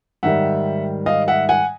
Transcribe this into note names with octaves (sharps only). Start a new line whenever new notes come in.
G#2 D#3 G3 E5 F#5
D#5 F5
E5 F#5
F#5 G#5